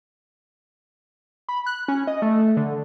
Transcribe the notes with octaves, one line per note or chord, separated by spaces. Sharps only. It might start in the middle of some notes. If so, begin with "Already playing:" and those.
B5
F#6
C#4
D#5
A3
D3